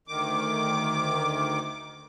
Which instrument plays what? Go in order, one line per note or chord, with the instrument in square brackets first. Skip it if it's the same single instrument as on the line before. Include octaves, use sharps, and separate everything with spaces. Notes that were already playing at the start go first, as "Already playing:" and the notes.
[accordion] D2 D#3 D6